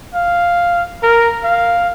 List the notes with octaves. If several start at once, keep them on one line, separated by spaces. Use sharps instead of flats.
F5
A#4
F5